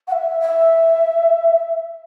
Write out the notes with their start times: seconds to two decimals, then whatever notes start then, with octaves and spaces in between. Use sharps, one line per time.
0.08 F#5
0.12 E5
0.41 E5